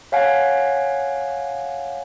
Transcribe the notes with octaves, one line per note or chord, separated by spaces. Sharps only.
C#5 F5 F#5 G#5